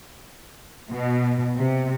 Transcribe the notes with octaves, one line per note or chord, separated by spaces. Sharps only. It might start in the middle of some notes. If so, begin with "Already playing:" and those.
B2
C3